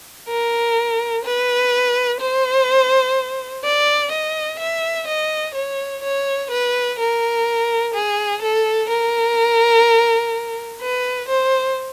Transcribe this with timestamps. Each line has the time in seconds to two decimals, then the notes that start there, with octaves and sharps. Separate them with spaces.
0.29 A#4
1.25 B4
2.21 C5
3.64 D5
4.12 D#5
4.59 E5
5.07 D#5
5.55 C#5
6.03 C#5
6.51 B4
6.99 A#4
7.94 G#4
8.43 A4
8.89 A#4
10.81 B4
11.28 C5